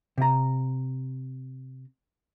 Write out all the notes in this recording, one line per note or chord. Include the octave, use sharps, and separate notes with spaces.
C3 A#5